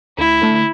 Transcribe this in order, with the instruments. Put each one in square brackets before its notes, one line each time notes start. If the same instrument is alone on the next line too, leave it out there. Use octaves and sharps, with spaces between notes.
[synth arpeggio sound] D2 [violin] E4
[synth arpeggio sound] D3 A3